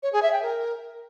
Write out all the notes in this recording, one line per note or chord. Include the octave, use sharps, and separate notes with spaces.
C#5
G#4
E5
G5
A#4